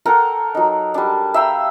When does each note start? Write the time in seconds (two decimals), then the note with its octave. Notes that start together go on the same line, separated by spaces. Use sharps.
0.05 A4 A#4 F#5 G5
0.55 F#3 D#4
0.94 G3 D4
1.34 E5 F5 G5 A#5